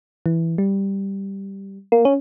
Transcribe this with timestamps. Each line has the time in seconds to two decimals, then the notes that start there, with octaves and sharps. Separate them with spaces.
0.26 E3
0.58 G3
1.92 A#3
2.05 C#4